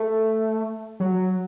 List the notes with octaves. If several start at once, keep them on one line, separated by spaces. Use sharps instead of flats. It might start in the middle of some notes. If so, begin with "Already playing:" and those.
Already playing: A3
F#3